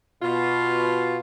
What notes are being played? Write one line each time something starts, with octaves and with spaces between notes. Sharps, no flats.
B2 F4